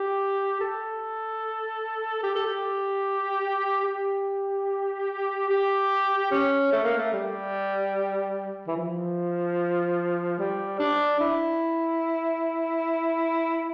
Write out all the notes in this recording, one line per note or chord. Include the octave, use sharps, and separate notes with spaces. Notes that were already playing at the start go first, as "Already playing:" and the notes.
Already playing: G4
A4
G4
A4
G4
G4
G4
C#4
A3
A#3
A3
G3
E3
F3
G3
D4
E4